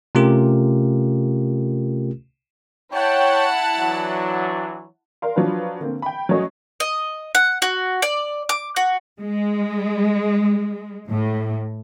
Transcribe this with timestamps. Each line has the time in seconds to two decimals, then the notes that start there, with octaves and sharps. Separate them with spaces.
0.15 C3 A3 C#4 F4 G4 A#4
2.93 E4 C#5 F#5 G5 A5
3.79 E3 F#3 D4
5.22 A#4 D5 F5 C6
5.36 F3 F#3 D4 F4 B4
5.80 D3 A#3 C4
6.02 G5 B5
6.29 F#3 A3 C#4 F#4 C#5 D#5
6.80 D#5
7.35 F#5
7.62 F#4
8.02 D5
8.49 D6
8.76 F#4
9.21 G#3
11.11 A2